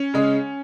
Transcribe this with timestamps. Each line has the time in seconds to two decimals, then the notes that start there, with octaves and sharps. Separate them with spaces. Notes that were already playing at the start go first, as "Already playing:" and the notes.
Already playing: C#4
0.14 C#3 G#3